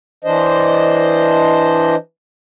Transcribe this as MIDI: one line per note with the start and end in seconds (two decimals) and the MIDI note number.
0.24 1.95 52
0.24 1.95 62
0.24 1.95 72
0.24 1.95 75